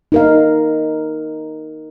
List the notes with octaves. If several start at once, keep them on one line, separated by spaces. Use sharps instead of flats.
D#4 A#4 F5